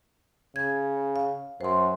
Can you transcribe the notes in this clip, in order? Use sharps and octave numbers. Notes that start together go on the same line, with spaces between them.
C#3 G#6
F5
F#2 C5 C6